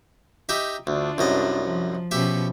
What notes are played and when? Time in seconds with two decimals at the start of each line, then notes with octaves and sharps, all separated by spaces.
0.49 D#4 G4 E5
0.87 D2 D4 F4
1.18 C2 F#2 D#5
1.63 F3
2.11 B2 F3 C#4 G4 E5